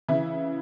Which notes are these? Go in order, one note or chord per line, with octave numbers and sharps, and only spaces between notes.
C#3 E3 E4